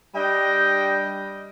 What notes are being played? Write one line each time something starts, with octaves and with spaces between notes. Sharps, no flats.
G3 D4 D#5 G5